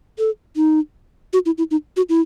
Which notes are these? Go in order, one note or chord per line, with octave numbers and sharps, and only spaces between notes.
A4
D#4
F#4
E4
E4
D#4
F#4
E4